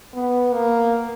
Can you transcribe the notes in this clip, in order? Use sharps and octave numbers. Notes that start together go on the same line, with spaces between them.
B3
A#3